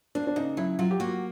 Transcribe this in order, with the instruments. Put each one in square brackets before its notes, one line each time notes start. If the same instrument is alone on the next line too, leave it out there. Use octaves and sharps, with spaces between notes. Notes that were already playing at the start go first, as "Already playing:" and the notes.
[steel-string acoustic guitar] A#3 [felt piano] D4
[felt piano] D4
[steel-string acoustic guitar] C#3 [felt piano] D#4
[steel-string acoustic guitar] F#3 [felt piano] E4
[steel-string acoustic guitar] F#3 [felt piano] F4
[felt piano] G4
[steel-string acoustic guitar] A#3 [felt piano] F#4